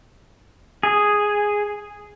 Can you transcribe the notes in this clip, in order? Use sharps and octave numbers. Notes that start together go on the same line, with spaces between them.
G#4